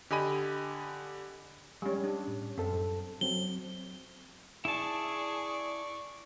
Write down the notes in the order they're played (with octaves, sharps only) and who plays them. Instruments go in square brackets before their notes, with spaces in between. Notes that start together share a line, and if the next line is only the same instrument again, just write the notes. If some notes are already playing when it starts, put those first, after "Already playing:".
[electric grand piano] D3 G4 D#5 G#5 B5 D#7
[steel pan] G3 G#3 C#4
D4
[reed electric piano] A2
[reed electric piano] F#2 A4 [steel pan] C4
[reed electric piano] F#3 C4 [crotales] G7
[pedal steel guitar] E4 A5 [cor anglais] G#4 [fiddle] D5 C#6